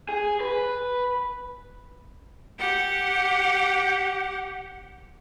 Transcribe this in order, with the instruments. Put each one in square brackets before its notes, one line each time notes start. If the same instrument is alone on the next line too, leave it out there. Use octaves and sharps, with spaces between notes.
[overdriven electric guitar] G#4
B4
[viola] G4 F#5